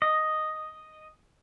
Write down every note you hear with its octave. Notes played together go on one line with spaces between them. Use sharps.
D#5